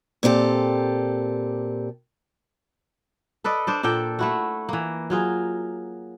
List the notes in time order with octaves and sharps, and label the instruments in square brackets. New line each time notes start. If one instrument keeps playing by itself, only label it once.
[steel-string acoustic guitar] A#2 C4 G4 A4
[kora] A4 B4 D5 D#5
D4 C5 D5
A#2 D4 A4 G5
A3 E4 F#4
E3 A#3
F#3 F4 G#4